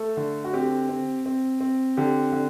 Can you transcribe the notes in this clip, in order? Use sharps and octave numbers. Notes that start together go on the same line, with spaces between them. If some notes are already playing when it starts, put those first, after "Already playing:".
Already playing: A3 A4
D3
F#4
C4 G4
C4
C4
C4
D3 G4
D3